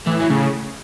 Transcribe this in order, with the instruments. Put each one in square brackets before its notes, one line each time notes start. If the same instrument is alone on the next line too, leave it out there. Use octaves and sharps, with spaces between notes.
[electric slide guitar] A2 A3 [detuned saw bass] E3
[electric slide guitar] F#3
[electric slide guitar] A2 A3 [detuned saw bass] C#3